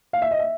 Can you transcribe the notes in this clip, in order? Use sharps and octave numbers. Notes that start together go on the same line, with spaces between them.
F5
E5
D#5
E5